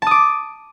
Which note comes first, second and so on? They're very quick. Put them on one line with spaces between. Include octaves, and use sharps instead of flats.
A5 D#6 D6